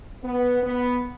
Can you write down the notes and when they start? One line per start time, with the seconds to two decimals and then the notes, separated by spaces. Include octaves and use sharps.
0.22 B3
0.62 B3